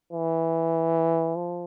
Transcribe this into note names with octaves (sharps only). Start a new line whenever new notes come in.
E3
F3